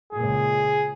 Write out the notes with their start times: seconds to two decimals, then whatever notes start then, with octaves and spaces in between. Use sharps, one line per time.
0.13 C#2 A#2 G#4